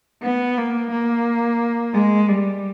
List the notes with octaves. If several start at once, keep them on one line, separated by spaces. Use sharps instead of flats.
B3
A#3
A#3
G#3
G3